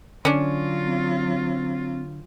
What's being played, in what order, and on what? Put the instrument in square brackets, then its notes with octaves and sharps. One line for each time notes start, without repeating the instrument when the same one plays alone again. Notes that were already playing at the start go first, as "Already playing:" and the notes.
[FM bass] D3 [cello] F#3 F4 [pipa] C#4 D4
[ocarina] C4